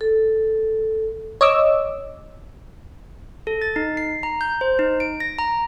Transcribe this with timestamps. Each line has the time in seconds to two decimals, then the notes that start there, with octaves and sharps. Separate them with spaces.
0.01 A4
1.41 C#5 D#5 D6 E6
3.47 A4
3.62 A6
3.76 D#4
3.97 C7
4.23 A#5
4.41 G6
4.61 C5
4.79 D#4
5.00 D7
5.20 A#6
5.39 A#5